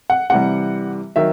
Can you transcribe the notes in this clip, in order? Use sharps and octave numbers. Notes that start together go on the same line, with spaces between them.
F#5
C3 E3 G3 F#5
D#3 F#3 E5